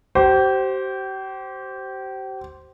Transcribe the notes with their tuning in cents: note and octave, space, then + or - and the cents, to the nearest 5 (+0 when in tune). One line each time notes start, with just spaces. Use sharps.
G4 -40 C5 +0